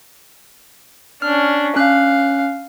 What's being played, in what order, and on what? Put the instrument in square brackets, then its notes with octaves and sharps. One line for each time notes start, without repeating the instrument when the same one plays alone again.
[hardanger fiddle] C#4 D4 [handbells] F6
[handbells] C#4 F#6 [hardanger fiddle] F5